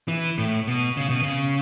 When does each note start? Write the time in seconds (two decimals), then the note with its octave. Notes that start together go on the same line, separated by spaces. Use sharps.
0.08 E3
0.38 A2
0.67 B2
0.97 C#3
1.10 B2
1.23 C#3